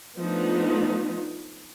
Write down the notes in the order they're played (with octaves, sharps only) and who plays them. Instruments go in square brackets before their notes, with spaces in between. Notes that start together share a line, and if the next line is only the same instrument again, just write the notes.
[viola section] F3 A3 B3 D4 D#4